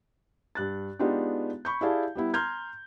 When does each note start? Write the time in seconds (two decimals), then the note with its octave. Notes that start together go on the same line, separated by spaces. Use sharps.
0.55 G2 F#6 A6
0.99 G#3 B3 D4 D#4 F4 G4
1.65 B5 C#6 G6
1.81 E4 G4 G#4 D5 F5 A5
2.15 G3 B3 E4
2.34 A#5 C6 F6 G6 G#6